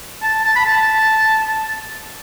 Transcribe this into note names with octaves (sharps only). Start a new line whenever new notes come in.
A5
A5
B5
A5